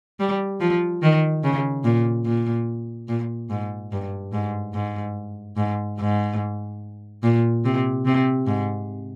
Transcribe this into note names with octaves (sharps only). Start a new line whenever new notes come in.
G3
F3
D#3
C#3
A#2
A#2
A#2
G#2
G2
G#2
G#2
G#2
G#2
A#2
C3
C3
G#2